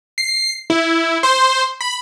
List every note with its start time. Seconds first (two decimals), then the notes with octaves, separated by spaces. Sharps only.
0.18 C7
0.70 E4
1.23 C5
1.81 B5